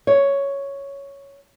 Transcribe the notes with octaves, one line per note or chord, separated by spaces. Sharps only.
C#5